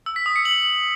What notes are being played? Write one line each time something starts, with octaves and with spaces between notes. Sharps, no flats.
E6
B6
D#6
C#7
F#7